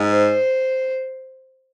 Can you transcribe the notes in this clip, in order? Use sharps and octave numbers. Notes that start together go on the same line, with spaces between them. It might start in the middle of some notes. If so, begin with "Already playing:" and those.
Already playing: G#2
C5